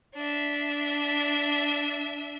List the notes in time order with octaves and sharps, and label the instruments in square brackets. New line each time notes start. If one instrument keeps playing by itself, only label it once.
[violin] D4 E5